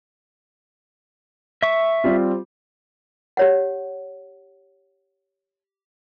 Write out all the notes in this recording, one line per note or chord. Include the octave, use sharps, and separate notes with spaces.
E5 C#6
G3 C4 F4
G4 C#5 F#5